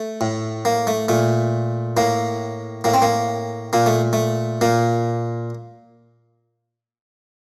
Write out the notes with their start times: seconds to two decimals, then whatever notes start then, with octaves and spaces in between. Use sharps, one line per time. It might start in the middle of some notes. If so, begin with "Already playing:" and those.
Already playing: A3
0.21 A2
0.65 A#3
0.87 A3
1.08 A#2 A3
1.97 A2 A#3
2.84 A2 A#3
2.94 C4
3.02 A#3
3.73 A#2 A#3
3.86 A3
4.13 A3
4.61 A#2 A#3